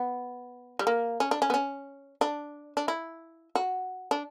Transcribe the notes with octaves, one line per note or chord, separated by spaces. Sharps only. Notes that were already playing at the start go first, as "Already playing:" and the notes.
Already playing: B3
G3
A#3
C#4
D4
C#4
B3
C#4
D4
D4
E4
F#4
D4